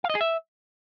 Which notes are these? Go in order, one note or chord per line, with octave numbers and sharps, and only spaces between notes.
F5
D#5
G#4
E5